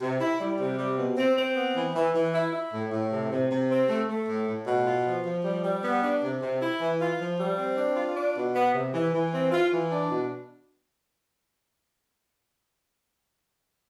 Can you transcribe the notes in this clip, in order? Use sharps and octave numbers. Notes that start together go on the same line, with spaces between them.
C3
E4
G3
C3
G3
B2
C4
C4
B3
E3
E3
E3
E4
E4
A2
A2
C3
C3
C3
C4
A3
A3
A2
A2
B2
F4
F3
F3
G3
G3
B3
D4
C3
C3
E4
E3
F4
F3
G3
C4
D4
F4
D4
B2
B3
C3
E3
E3
C4
F4
E3
D4
B2